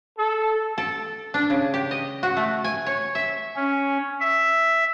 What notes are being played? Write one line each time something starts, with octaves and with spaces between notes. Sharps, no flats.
A4
A4
D4
C#3
G4
D#5
F#4
A3
G#5
C#5
E5
C#4
E5